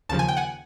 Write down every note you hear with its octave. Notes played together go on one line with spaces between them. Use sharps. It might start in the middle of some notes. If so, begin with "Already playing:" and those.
D#2 C#3 F3 A5
G#5
G5
F#5 G#5